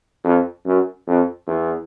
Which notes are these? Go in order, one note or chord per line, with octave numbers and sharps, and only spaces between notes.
F2
F#2
F2
E2